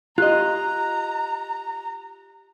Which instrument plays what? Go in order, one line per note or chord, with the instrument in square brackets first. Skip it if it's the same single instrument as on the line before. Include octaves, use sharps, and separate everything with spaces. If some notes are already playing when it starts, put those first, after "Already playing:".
[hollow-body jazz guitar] F4 D#5 [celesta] G4 F#6 [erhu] A#5